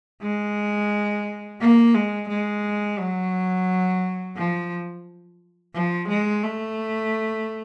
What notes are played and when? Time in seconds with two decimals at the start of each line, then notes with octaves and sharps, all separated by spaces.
0.22 G#3
1.60 A#3
1.94 G#3
2.29 G#3
2.98 F#3
4.36 F3
5.74 F3
6.09 G#3
6.43 A3